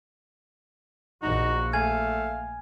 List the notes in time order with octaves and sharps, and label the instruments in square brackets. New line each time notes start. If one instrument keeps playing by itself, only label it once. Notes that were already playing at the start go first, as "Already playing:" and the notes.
[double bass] A#1 A#2 [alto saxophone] D#4 [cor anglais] F#4
[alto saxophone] A3 [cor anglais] F5 [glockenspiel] G#5 G#6